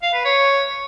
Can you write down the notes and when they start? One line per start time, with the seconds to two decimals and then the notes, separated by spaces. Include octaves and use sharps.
0.03 F5
0.14 B4
0.25 C#5